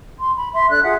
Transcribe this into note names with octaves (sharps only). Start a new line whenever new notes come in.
C6
B5
E5 C6
D4 A4 D5 F#6
F4 G#4 E5 F#5